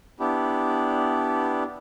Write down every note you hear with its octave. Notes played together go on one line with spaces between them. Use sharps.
B3 D4 E4 G4